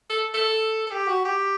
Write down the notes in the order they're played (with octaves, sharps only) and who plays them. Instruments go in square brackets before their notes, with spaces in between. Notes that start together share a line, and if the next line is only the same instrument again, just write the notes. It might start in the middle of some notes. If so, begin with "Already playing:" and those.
[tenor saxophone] A4
A4
A4
G4
F#4
G4